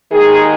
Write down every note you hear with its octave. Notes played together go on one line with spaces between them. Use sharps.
D#2 D#3 G#3 D#4 G#4